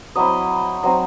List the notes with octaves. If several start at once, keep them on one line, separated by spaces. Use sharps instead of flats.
F#3 C4 E4 D#5
F#3 C4 D#4 D#5